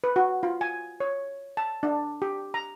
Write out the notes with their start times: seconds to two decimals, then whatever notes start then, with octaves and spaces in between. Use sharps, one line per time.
0.04 B4
0.16 F#4
0.43 F4
0.61 G#5
1.00 C#5
1.57 A5
1.83 D4
2.22 G4
2.54 A#5